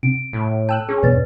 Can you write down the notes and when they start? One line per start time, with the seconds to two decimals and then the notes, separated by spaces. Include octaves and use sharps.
0.03 C3 D7
0.33 A2
0.69 G5 A5 E6 F#6
0.89 C#4 G#4
1.03 E2 G2 B2 B4 D5 A6